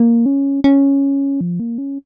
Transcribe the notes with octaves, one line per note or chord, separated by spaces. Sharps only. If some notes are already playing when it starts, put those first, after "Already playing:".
Already playing: A#3
C#4
C#4
F3
A#3
C#4